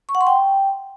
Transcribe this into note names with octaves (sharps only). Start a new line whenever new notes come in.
C#6
F#5
C6
G5